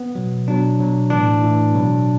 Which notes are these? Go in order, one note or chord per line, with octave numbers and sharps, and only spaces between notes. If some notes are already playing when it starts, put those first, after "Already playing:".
Already playing: B3
B2 F#3
B2 F#3 D4
B2 F#3
A2 E3 D4
A2 E3
B2 F#3